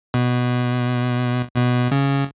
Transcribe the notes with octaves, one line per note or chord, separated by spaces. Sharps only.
B2
B2
C#3